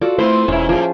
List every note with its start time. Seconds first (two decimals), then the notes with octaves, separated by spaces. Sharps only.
0.02 F4 F#4 A4 D5
0.19 A3 B3 C4 E4 F4 C5
0.48 E1 G#2 C#4 E4
0.69 A2 F3 G3 A#3 G#4